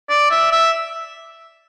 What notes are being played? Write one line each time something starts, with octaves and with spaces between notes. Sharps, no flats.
D5
E5
E5